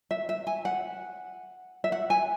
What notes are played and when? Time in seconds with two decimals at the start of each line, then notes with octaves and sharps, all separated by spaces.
0.11 E5
0.29 E5
0.47 G#5
0.65 F#5
1.84 E5
1.92 F#5
2.10 G#5